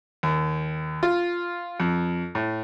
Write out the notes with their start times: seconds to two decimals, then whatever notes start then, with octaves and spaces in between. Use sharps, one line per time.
0.23 D#2
1.03 F4
1.80 F2
2.35 A2